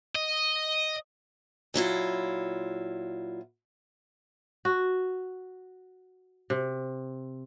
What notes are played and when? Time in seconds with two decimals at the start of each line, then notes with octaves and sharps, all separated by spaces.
0.16 D#5
1.74 A#2 F#3 E4 F4
4.65 F#4
6.50 C3